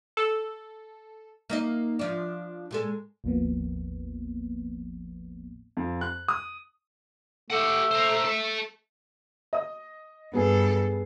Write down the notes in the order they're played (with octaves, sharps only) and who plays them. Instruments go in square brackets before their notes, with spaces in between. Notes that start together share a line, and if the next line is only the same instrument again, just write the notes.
[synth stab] A4
[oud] A#3 D#4 D#5
F3 D4
A#2 G#3 A4
[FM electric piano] G#1 D#2 A2 F3 A#3 B3
[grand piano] F2
F#6
D#6
[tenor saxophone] A3 [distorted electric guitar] G4 F#5
[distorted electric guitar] C5 A#5
A4 E5
[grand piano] D#5 D#6
[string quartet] G2 A4 [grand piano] B3 G#4